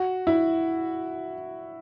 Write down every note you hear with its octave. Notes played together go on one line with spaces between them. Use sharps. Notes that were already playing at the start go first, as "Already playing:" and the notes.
Already playing: F#4
E4